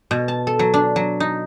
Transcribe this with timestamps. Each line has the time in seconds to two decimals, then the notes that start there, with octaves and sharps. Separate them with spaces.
0.11 B2
0.28 A5
0.47 A4
0.59 F#3
0.74 D4
0.96 F#3
1.20 D#4